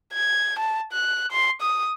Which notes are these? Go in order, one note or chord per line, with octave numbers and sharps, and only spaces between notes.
G#6
A5
F#6
C6
D#6